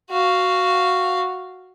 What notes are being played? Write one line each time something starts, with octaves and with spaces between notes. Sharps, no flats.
F#4 F5